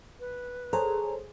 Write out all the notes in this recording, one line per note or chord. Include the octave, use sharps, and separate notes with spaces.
B4
G#4 A4 C5 C#5 A#5